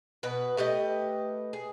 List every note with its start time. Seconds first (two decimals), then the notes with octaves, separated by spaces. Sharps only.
0.23 B2 B4
0.57 A3 G4 B4 D#5
1.53 G#4